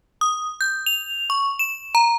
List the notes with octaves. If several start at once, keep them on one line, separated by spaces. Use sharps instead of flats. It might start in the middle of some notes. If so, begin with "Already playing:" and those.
D#6
G6
F7
C#6
E7
A#5